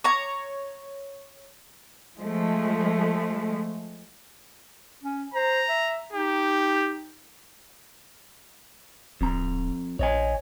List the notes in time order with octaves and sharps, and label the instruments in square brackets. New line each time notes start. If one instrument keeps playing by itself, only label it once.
[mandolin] C#5 A#5
[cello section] F3 G#3 A3
[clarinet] C#4
[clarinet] C5 [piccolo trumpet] A#5
[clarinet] E5
[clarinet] D#4 [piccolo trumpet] G4
[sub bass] D1 [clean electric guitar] F2 A#5
[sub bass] A#1 [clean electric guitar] C#5 D#5 G#5